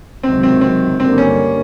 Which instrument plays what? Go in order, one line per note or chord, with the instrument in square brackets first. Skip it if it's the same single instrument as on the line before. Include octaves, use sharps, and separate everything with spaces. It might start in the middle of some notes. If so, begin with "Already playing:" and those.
[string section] C#2 C3 D#3 F#3 [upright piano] C4
[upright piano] C4
C4
[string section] G2 D3 G3 A#3 [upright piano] C4
[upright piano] C#4